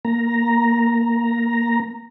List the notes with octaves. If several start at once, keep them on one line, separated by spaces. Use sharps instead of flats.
A#3 A#5